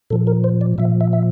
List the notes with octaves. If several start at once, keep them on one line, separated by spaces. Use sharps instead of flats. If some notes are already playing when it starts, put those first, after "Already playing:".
A#2 F3 A4
A#4
C5
D5
A#2 F3 E5
E5
E5